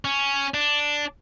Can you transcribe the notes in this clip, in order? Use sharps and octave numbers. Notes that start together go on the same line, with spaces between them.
C#4
D4